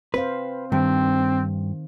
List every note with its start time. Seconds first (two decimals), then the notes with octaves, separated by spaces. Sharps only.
0.14 C4 B4 C5 F5
0.72 G2 D#3 C4